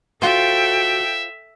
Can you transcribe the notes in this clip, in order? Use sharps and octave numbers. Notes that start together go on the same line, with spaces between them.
F4 F#4 A4 C5 E5 G5